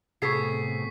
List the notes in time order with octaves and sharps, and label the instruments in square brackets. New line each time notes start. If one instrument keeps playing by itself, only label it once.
[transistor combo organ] A2 C3 [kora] B3 G#4 A4 [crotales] C#6 B6 C7